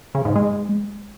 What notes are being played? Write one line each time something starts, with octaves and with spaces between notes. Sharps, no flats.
C#3
G#2
G#3